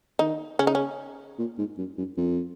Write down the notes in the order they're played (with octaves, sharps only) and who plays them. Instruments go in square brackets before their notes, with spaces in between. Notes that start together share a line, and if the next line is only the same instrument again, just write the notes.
[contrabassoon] D#3 [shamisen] D#4
[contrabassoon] C#3 [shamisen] C#4
[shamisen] D#4
C#4
[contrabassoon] A#2
G#2
F#2
F#2
F2